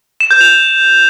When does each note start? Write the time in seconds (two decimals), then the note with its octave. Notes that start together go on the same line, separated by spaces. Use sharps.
0.20 E7
0.31 G6
0.41 F7